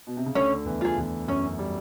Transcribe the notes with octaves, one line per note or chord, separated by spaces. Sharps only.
B2
C3
C#3
D2 D3 C#4
E2 E3
F4 G#4
E2 E3
F#2 F#3 C#4
G3